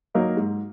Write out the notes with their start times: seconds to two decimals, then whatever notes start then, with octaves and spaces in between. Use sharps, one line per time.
0.14 F#3 A#3 D#4 A#4
0.37 G#2